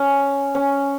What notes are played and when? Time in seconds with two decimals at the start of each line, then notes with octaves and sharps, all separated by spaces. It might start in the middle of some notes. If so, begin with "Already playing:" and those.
Already playing: C#4
0.55 C#4